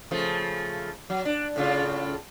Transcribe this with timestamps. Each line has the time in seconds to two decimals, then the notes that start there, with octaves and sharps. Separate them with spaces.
0.11 C#3 F3 A3
1.10 F#3
1.25 D4
1.56 A2 C#3 F4